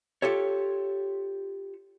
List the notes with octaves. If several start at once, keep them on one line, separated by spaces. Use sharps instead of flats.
F4 G4 A4 C#5